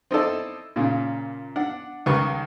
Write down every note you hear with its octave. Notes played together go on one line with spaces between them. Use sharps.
C4 D#4 E4 A4 D5
A#2 C#3
D4 F#5
C#2 D#3 G3 B4 C#6